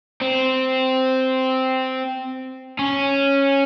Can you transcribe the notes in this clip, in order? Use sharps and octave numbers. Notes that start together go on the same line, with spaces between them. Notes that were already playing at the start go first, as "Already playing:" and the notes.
C4
C#4